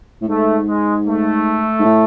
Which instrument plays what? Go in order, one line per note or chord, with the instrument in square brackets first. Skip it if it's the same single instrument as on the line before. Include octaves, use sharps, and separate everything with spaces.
[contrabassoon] A2
[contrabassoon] G#2 [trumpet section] A3
[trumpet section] G#3
A3
[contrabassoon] G#2
A2